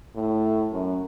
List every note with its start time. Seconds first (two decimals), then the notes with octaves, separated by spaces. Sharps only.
0.16 A2
0.72 F#2